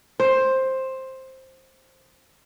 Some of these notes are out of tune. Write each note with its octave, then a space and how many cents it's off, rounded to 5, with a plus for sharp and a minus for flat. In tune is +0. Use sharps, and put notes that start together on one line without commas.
C5 +10